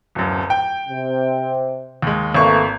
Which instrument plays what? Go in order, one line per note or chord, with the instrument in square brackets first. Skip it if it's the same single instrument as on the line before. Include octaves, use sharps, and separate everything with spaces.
[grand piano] D1 F#2
G5
[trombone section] C3
[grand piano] D#2 G#3
[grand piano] G#1 C#6 [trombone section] E3 A3 A#3